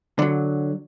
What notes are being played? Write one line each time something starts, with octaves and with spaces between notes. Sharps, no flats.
D3 F#3